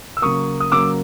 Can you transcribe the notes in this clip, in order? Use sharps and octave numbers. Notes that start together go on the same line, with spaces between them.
E6
C#3 F#3 A#3 C#6 D#6
D#6
C#3 F#3 A#3 D6 E6